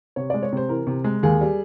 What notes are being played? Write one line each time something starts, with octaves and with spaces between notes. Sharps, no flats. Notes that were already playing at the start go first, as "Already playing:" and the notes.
C3 C#5
G#3 D5
C#5
C3 C5
E3 A#4
C3
G#3
D#2 G#4
G3